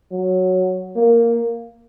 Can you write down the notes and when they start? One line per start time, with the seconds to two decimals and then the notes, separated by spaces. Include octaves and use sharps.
0.11 F#3
0.96 A#3